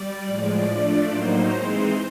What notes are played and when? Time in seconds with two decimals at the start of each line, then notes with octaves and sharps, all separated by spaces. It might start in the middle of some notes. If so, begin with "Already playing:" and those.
Already playing: G3 D5
0.25 A2 F3 G#3
0.67 F3 A3 D4
1.09 A2 F#3 A#3 D#4 C5
1.51 E3 G#3 C4 D#4